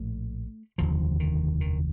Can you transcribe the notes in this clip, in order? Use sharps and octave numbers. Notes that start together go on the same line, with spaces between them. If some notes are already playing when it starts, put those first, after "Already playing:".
Already playing: A#1 A2 A3
F1 D#2 D3 F3
D#3
D#3